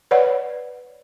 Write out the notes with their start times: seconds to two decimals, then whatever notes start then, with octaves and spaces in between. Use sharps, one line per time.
0.11 B4 C#5 D5 F#5